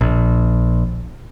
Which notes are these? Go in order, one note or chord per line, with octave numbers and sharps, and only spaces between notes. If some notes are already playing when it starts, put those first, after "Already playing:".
A#1